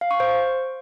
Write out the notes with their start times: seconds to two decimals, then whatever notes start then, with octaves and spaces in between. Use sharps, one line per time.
0.01 F5
0.11 C#6
0.20 C5